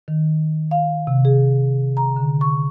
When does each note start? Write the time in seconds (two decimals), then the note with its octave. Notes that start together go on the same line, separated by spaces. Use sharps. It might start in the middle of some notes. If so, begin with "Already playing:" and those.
0.08 D#3
0.71 F5
1.07 C3
1.25 G#4
1.97 A#5
2.16 D3
2.41 C#6